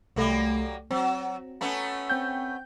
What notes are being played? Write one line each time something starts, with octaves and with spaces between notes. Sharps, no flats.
C2 F#3 G3 A3 A#3
F#3 C4
A3 B3 C#4 A#5
C4 G5 G6